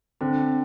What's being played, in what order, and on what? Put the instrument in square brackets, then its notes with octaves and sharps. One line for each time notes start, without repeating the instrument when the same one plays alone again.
[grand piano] D3 [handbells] C4